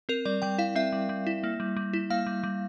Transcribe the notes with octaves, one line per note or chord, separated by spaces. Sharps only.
C4 A#4
G3 D5
G3 G5
E4 F5
C4 E5
G3
G3
E4
A#3
G3
G3
E4
A#3 F5
G3
G3